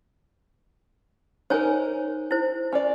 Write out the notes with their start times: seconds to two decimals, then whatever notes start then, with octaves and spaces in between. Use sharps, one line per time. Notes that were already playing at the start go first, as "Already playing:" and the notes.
1.50 D#4 A#4 C5 C#5 G#5
2.31 E4 C5
2.72 C#4 F4 D5